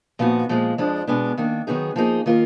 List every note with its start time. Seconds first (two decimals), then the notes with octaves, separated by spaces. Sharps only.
0.19 A#2 F3 B3 D#4 F#4
0.49 A#2 F3 G#3
0.78 F2 F3 G#3 D4
1.07 B2 G#3 B3 D4
1.37 D#3 A#3 D4
1.67 D#3 F#3 B3 D#4 G#4
1.96 F3 A#3 D#4 G#4
2.26 D#3 A#3 F4 A#4